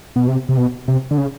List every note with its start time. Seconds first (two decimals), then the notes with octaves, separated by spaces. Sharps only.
0.16 B2
0.28 C3
0.49 C3
0.57 B2
0.88 C3
1.11 D3
1.18 C#3